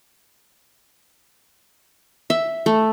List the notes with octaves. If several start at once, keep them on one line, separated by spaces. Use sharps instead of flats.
E5
A3